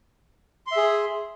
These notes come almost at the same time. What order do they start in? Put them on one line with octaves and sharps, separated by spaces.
C6 E5 G#4